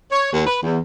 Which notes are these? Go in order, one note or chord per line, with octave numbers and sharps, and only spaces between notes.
C#5
D#2
B4
E2